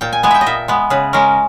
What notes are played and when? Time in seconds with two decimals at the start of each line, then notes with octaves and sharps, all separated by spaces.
0.01 A#2 G5
0.13 G#5
0.23 G#3 B3 G#5
0.31 E5 G5
0.41 D#5
0.46 A#2 E5
0.68 G#3 B3
0.90 C#3 B4
1.13 G#3 C#4 A#4